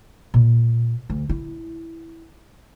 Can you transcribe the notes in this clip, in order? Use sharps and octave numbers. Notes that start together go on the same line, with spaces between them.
A#2
D2
E4